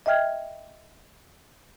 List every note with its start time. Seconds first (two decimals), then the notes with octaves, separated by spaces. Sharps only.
0.06 D#5 E5 G5 F6 G#6